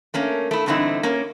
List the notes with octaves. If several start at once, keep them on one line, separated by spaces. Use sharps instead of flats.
A3 A#3 C#4
A3 E4
E2 G2 D3 C4 D#4 E4
A#3 C#4